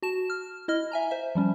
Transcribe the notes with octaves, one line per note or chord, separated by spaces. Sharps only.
F#4 A5 E7
F6
E4 D#5 F6
E5 G#5 A#5
C5 E5
F3 G3 C#4